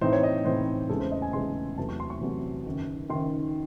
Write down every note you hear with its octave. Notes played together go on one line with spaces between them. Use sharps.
A2 E3 C4 D#4 C5
C#5
D#5
A2 E3 C4 D#4 C5
E2 C#3 G#3 A4
C5
D#5
G#5
E2 C#3 G#3 C6
E2 C3 F#3 A3 A5
C#6
C6
C#6
E2 C3 F#3 A3
F#1 F#2 D#3
F#1 F#2 D#3 C6